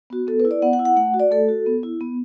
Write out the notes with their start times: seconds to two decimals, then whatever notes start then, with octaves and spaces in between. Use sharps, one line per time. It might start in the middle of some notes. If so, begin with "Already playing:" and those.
0.10 B3 F#4
0.27 B3 A4
0.40 B4
0.45 E4
0.51 D5
0.62 B3 F#5
0.73 F#5
0.79 E4
0.85 F#5
0.96 A3 F#5
1.14 F#4
1.20 D5
1.31 A3 A4
1.49 F#4
1.66 B3
1.83 E4
2.01 B3